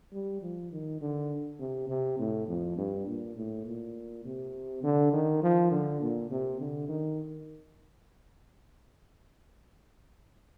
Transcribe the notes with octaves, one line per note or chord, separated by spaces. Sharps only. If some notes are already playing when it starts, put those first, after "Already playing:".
G3
F3
D#3
D3
C3
C3
A2
F2
G2
A#2
A2
A#2
C3
D3
D#3
F3
D3
A#2
C3
D3
D#3